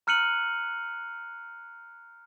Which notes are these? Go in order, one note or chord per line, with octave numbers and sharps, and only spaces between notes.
A#5 F6 F#6 C#7 D#7 F#7